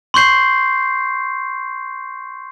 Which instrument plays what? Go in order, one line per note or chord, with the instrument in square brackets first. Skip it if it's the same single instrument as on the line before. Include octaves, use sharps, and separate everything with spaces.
[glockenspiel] C6 C#6 G6 C7